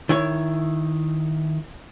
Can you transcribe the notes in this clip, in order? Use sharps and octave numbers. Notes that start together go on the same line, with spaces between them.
D#3 E4 C#5